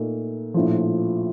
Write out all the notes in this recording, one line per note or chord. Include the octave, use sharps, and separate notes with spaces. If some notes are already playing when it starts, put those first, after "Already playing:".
Already playing: A#2 A3 D#4
A#1 A2 F3